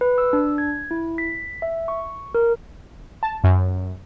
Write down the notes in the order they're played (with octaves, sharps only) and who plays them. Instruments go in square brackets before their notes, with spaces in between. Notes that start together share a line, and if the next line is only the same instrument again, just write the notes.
[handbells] B4
E6
D4
G#6
E4
B6
E5
C#6
A#4
[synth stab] A5
F#2